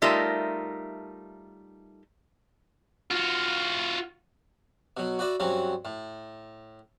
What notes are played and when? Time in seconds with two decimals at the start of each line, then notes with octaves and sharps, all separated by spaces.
0.02 G3 A3 D#4 F4 A#4 E5
3.11 F4 F#4
4.97 B2 F#3
5.19 F#4 B4 D5 E5
5.40 G2 F#3 C4 C#4
5.85 A2